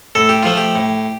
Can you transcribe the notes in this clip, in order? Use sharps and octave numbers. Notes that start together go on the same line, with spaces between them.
A2 A4
G4
F3 A3 F4
G4
A2